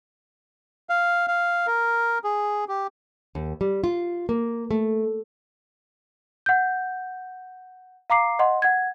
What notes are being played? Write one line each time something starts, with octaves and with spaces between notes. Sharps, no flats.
F5
F5
A#4
G#4
G4
D#2
G3
F4
A#3
A3
F#5 G6
F5 A#5 D6 C7
D#5 F#5 C6
F#5 G#6